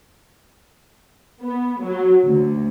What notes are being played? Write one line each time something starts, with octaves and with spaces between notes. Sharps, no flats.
B3
F#3
D2